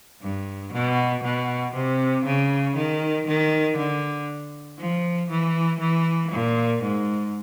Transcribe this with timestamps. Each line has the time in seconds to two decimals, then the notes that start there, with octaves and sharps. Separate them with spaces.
0.22 G2
0.73 B2
1.24 B2
1.74 C3
2.25 C#3
2.76 D#3
3.27 D#3
3.77 D3
4.79 F3
5.30 E3
5.80 E3
6.31 A#2
6.82 G#2